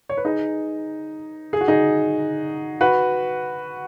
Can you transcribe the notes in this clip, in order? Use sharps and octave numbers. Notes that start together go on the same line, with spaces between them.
C#5
B4
D#4 G#4
G#4
F#4
D#4 G#4
F#4 B4